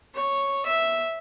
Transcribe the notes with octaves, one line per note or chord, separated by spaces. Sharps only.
C#5
E5